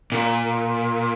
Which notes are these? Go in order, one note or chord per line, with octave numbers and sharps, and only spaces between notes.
A#2